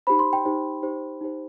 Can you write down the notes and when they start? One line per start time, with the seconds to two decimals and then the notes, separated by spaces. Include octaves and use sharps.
0.07 D#4 G4 C5 B5
0.19 C6
0.33 G5
0.45 D#4 G4 C5
0.82 D#4 G4 C5
1.21 D#4 G4 C5